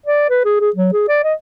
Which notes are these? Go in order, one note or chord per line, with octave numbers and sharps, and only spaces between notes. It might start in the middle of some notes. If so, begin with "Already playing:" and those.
D5
B4
G#4
G#4
F#3
G#4
D5
D#5